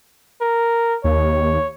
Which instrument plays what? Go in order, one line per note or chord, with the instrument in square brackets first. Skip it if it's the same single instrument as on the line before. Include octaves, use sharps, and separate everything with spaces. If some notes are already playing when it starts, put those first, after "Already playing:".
[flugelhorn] A#4
[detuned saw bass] D#2 [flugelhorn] C#5